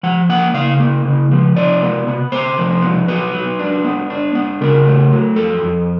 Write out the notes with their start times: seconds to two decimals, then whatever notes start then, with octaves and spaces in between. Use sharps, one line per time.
0.03 F3 F#5
0.29 A#3 F#5
0.54 C#3 F5
0.79 A#3
1.05 C#3
1.31 F3
1.56 C3 D5
1.82 B3
2.07 B3
2.32 C3 C5
2.58 F3
2.82 B3
3.08 F#3 B4
3.34 F#3
3.59 D4
3.85 B3
4.10 D4
4.35 B3
4.61 C#3 A#4
4.86 A3
5.12 F#3
5.36 F2 A4
5.62 F2